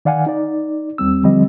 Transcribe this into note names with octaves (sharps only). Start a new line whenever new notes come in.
D#3 D5 F5 F#5 G#5
D#4 D5
D#2 G3 C4 E6
D3 F3 G3 C4 D#5